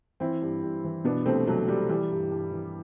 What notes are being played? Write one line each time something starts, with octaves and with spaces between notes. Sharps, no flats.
E3 C4 E4
G2
G2
E3
B2 B3 D4
C2 A3 C4
C2 F#3 A3
B2 G3
E3 G3
G2
G2
E3